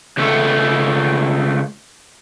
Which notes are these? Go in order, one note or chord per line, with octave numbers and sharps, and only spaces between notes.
C#2 A3